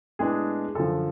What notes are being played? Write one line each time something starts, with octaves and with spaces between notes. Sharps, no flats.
A2 G#3 B3 D4 G#4
F#2 D3 F3 A4